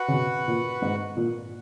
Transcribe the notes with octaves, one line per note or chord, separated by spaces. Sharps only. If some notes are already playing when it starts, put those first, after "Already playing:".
Already playing: F#4 B4 F#5
C#3
B2
A#2
G#2
A#2